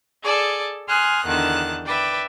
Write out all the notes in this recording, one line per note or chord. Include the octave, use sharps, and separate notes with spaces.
G#4 A4 D5
G#5 C6 D#6 F6 F#6
E2 D3 D#3 A5 F#6
B4 D5 E5 G5